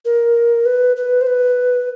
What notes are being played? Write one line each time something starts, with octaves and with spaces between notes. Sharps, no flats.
A#4
B4
B4
C5
B4